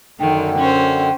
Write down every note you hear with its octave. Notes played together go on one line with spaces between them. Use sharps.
F#2 D3 D#3 G5
C#4 C5